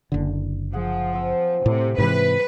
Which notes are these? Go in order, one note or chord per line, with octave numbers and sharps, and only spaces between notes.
F#1 D3
F3 G#4 F#5
C4 E6
A2 C3
G#2 C3 E3 B4